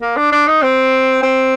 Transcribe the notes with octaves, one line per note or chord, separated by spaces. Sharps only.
A#3
D4
D4
D#4
C4
C4